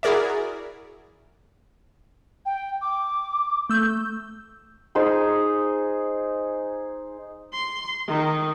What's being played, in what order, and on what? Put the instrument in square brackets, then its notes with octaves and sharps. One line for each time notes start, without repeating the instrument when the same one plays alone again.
[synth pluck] E4 F#4 G#4 A#4 D5 E5
[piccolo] G5
D6
[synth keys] A3 E6 G6
[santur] D#4 G#4 C5
[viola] C6
D#3